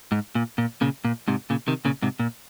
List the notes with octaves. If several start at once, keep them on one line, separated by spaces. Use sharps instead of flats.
G#2
A#2
A#2
A#2 C#3
A#2
G#2 C3
A#2 C#3
C3 D#3
A#2 C#3
G#2 C3
A#2